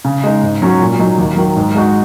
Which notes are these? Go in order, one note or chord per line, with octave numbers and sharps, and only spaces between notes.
C#3
G#3 D#4
G#2
F#3 C#4 F#4
A#2
F#3 D#4
D#2
D#3 F#3
G#2
G#3 D#4 F#4